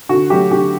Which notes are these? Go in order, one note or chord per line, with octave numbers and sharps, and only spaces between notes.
D3 F#4
F#3 A3 G4
D3 G4